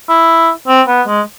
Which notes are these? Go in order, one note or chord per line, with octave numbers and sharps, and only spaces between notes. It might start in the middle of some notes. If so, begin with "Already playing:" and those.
E4
C4
B3
G#3